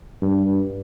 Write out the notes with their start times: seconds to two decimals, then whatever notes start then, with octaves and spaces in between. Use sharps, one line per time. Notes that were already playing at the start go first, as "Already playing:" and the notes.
0.22 G2